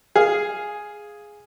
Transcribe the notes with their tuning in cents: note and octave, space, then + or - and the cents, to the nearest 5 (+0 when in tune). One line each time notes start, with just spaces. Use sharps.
G#4 +0 F5 +0